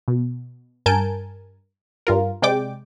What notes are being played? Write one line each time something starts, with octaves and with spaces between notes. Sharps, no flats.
B2
G2 A#4 G#5 A5 G6 D7
G2 F4 A#4
C3 G#3 D5 G5 D6